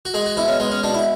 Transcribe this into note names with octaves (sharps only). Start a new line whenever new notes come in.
F#4
G#3 G#4
F#4
B2 E4
C#4
G#3 B3
C#4
B2 D4
E4